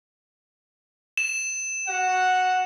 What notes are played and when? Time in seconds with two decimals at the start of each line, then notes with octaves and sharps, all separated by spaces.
1.17 E7
1.88 F#4 F#5